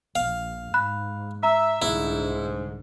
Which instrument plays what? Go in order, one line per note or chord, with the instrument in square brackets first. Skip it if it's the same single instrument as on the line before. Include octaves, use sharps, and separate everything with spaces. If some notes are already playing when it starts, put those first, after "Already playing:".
[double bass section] A#1 [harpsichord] F5
[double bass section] G#2 [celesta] B5 F#6
[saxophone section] E5 [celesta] A#5
[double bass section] C2 D3 [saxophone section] G#2 [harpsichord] E4